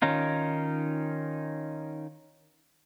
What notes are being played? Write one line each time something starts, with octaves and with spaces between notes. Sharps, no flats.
D#3 C#4 D#4 F4